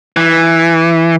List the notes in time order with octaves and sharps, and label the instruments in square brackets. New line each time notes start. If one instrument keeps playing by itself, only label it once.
[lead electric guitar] E3